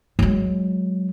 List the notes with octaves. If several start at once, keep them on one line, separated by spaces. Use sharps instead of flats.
F#3 G#3